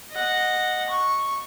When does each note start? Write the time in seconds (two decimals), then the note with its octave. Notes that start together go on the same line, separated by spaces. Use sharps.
0.11 D#5 F#5
0.89 C#6